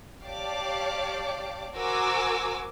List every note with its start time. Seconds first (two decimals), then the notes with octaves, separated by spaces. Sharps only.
0.24 G4 C#5 D5 F5 A5 D6
1.77 F#4 A#4 C5 G#5 D6 E6